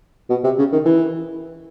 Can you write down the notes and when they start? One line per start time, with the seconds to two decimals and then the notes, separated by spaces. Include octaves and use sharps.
0.30 B2
0.44 C3
0.59 C#3
0.73 D#3
0.86 E3